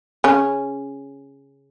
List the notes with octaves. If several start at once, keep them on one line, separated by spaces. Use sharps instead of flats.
C#3 C#4